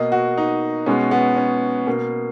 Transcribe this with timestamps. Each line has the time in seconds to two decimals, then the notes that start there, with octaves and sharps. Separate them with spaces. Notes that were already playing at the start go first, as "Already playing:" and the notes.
Already playing: B2 A#3 D#5
0.12 F#4
0.38 D#4
0.86 B2 G#3 B3 C#4
1.11 B3
1.37 C#4
1.87 B2 A#3